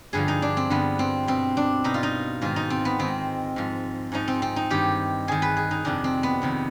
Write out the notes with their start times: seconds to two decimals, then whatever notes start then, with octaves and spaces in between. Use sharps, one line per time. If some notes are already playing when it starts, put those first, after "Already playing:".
0.13 G2 D3 F3 G#4
0.28 D#4
0.42 D4
0.57 C4
0.70 G2 D3 F3 B3
0.99 C4
1.27 B2 C4
1.57 D4
1.84 B2 D#4
1.94 F4
2.03 D#4
2.42 G#2 D#3 F4
2.56 D#4
2.70 C4
2.85 B3
2.99 G#2 D#3 C4
3.56 G#2 F3
4.12 G#2 F3 D#4
4.28 C4
4.42 C4
4.56 D#4
4.70 G2 D#3 G4
5.28 G2 D#3 G#4
5.42 B4
5.57 G#4
5.71 D#4
5.85 F2 C3 D#3 D4
6.04 C4
6.23 B3
6.42 F2 C3 D#3